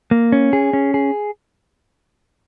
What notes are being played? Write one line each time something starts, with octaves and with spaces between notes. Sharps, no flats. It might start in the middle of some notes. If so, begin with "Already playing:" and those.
A#3
C#4
G#4
C#4
G#4